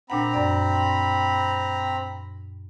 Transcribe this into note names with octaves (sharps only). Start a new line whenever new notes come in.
A#2 C4 D4 F#5 A#5 B5
F#2 D5